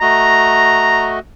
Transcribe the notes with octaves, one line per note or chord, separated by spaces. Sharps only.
A3 F#4 D#5 A#5